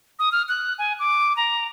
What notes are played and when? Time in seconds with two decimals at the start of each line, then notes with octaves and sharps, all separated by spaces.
0.19 D#6
0.32 F6
0.49 F#6
0.79 G#5
0.99 D6
1.37 A#5